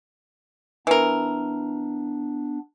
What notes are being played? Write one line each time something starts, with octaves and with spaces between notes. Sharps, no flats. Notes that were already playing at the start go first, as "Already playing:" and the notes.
E3 B3 D4 A#4